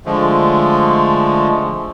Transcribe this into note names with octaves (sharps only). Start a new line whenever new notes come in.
D3 F3 G#3 A3